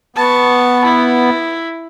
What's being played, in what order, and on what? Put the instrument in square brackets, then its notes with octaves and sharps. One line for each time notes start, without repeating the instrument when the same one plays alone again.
[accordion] B3 [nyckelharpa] A5 C#6
[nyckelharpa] E4